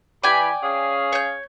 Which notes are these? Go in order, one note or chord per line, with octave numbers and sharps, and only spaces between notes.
E3 G4 D5 G5 G#5 B5
C#4 G#4 F5
C#5 G6